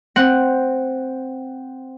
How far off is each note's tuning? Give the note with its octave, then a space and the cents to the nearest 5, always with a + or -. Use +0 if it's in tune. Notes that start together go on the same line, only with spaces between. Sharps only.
C4 +0 F#5 +0